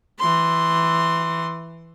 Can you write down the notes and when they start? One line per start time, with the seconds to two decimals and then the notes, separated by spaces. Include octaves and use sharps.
0.20 E3 C6